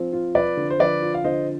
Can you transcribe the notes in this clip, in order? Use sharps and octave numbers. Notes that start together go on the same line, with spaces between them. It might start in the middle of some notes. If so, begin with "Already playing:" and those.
Already playing: F3 C4 F4
F4
F3 B4 D5
D3
C5
F3 B4 D5
F4
F5
D3 C5 D#5